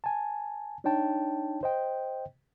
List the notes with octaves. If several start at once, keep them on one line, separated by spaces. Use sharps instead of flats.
G#5 A5
D4 D#4 C#5 G5 A5
C5 D#5 G5